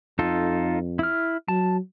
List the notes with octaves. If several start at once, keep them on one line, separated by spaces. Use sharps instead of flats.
F2 D#4 F4 A4
E4 F6
F#3 A5